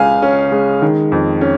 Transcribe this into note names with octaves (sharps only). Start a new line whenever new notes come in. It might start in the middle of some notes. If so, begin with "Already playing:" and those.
Already playing: C#2 C#3 F5 G#5
C#4
G#3
D#3
F2
C#4